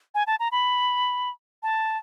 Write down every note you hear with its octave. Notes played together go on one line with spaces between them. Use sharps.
G#5
A5
A#5
B5
A5